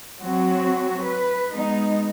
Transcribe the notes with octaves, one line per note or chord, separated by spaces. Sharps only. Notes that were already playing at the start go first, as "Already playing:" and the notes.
F#3 C4 F#4
B4
G#3 B3 D#4